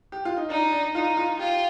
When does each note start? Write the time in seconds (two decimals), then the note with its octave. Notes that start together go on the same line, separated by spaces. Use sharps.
0.12 G4
0.25 F4
0.37 D#4
0.50 D4 D#4
0.73 D4
0.94 D#4 F4
1.17 F4
1.39 F4 G4